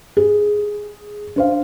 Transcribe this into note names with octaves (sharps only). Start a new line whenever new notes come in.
G#4
D4 C5 F5